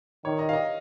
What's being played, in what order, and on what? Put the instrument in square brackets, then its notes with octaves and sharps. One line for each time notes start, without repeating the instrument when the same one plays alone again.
[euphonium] D#3 [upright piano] C#5
[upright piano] D#5
F5
D#5